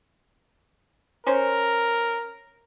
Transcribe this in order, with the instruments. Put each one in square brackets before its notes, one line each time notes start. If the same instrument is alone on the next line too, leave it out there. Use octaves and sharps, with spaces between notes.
[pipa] C#4 C5 [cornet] A#4